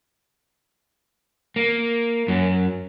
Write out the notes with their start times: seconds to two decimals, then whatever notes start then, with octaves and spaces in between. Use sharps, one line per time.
1.56 A#3
2.28 F#2